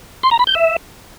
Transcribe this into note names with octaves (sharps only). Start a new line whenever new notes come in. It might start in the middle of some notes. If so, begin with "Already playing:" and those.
C6
A#5
B5
G6
E5